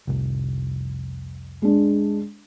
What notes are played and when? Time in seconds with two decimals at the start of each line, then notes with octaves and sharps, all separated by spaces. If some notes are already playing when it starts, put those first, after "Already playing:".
0.07 F1 C2
1.62 G#3 D4